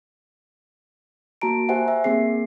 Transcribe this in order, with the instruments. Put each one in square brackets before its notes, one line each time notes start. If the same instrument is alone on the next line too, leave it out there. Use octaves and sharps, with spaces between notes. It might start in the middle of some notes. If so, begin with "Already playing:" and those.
[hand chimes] A#3 F#4 A5 A#5 D7
G4 C5 E5 F#5 G#5
E5
A#3 C4 G#4 C7